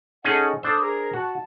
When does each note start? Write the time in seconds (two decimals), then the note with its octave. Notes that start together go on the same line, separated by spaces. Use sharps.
0.25 C#4 D#4 G#4 A4 D#5 F#5
0.63 D4 A4 C5 D#6 E6
0.80 G#4 A#4 A#5
1.13 F#4 A5